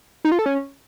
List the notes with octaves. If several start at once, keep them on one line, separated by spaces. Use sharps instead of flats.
D#4
F4
A4
C#4